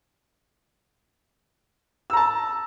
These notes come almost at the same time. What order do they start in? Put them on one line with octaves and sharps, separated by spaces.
E6 A#5 A5